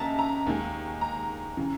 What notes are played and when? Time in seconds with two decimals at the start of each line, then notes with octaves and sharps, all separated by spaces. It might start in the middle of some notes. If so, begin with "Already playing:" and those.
Already playing: D#2 C#3 C#4 D#5 E5 A5 A#5
0.19 A#5
0.47 D#2 D#3 G#3
1.01 A#5
1.57 C#3 E3